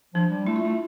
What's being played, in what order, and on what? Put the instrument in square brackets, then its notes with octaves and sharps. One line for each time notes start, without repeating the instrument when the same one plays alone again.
[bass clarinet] F3 [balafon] D4
[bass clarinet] G3
[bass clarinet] A3 [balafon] E4
[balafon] F4
[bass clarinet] A3 [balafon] E4